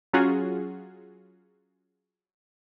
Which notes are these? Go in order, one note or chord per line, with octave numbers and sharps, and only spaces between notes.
F#3 C#4 F4 F#4 G#4